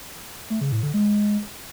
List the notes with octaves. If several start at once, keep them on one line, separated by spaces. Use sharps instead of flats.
A3
C#3
A2
D3
G#3